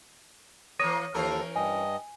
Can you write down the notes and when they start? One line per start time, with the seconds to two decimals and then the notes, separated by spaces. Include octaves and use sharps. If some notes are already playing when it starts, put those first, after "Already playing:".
0.79 E3 A#3 C#5 D#6 A#6 D#7
1.14 D#2 E3 C#4 A4 A#4
1.56 G2 D#5 G#5